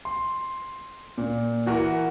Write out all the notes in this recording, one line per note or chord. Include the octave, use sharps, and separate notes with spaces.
C6
A#2
E3 F#4 A#4